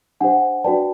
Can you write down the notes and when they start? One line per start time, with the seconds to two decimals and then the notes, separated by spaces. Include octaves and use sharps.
0.20 D4 G4 C5 F#5 G#5
0.64 D4 F#4 B4 D5 G5 A5